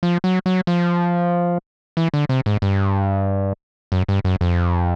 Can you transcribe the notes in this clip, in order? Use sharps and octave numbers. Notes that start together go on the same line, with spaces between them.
F3
F#3
F#3
F3
E3
D3
C3
G#2
G2
F#2
G2
F#2
F2